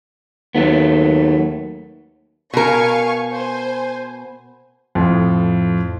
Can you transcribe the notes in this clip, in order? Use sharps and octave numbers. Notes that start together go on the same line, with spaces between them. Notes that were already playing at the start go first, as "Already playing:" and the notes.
D#2 F#3 A3 B3
B2 A#4 F5 G#5 C#6
C5 G#5
F2 A2